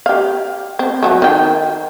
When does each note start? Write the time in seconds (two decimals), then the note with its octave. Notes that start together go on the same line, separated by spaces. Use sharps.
0.06 G4 F5
0.79 C4
1.03 F3 F#3 A3
1.22 D#3 G5